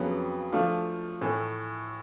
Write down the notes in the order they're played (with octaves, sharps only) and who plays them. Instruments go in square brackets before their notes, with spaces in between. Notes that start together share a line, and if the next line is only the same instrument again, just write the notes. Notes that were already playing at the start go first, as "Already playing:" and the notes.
Already playing: [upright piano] F2 C#3 F#3 B3
F3 A3 D4 F4
A2 E3 A3